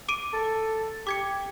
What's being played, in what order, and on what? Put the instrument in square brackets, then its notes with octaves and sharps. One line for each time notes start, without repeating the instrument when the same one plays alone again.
[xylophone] D6 D7 D#7
[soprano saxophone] A4
[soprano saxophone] G4 [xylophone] D6 G#6 C#7